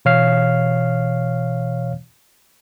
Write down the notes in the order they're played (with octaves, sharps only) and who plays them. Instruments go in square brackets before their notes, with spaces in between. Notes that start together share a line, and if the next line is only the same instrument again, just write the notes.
[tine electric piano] B2 E3 C#5 F5 F6 C7